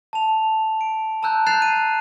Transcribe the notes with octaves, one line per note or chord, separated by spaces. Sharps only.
A5 F7
D7
A5 A#5 E6 F#6 G6
F#6 G6 A6 C7 E7 F7
D#7